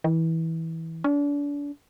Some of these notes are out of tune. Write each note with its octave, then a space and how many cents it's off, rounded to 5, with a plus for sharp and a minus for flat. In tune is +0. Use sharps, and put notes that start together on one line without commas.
E3 -20
D4 -35